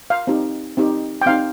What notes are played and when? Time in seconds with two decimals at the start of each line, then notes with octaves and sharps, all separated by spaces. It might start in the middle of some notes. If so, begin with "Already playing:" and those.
0.10 F5
0.27 C4 D#4 G4
0.77 C4 D#4 G4
1.21 G5
1.26 C4 D#4 G4 F5